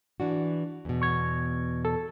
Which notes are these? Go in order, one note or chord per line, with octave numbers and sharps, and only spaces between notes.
E3 D4 F#4
E2 B2
C#6 G#6
A4